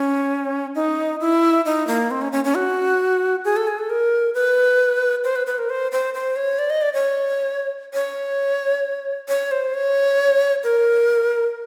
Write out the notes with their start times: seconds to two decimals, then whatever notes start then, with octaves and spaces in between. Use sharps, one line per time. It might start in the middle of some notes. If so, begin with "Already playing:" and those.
Already playing: C#4
0.75 D#4
1.21 E4
1.66 D#4
1.87 A#3
2.11 C4
2.22 C#4
2.32 C#4
2.44 C#4
2.55 F#4
3.45 G#4
3.56 A4
3.67 G#4
3.78 A4
3.90 A#4
4.34 B4
5.24 C5
5.36 B4
5.47 B4
5.58 A#4
5.70 C5
5.92 C5
6.14 C5
6.36 C#5
6.59 D5
6.70 D#5
6.82 D5
6.94 C#5
7.94 C#5
9.29 C#5
9.51 C5
9.74 C#5
10.64 A#4